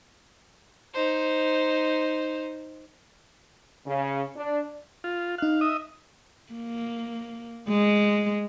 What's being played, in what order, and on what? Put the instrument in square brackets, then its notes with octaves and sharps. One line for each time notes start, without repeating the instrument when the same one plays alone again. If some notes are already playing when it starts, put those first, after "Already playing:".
[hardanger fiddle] D#4 C5
[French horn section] C#3
D4
[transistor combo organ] F4
[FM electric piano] D#4 F#6 [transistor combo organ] F5
[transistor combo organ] D#5 E5 D#6
[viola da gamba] A#3
G#3